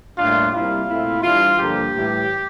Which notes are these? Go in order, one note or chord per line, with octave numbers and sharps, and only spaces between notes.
A2 G3 A#3 D4 F4
C3 G3 A#3 E4 F4
A#2 A3 C4 E4
E3 G3 D4 F4
G2 D3 F3 A#3 G4
A2 E3 G3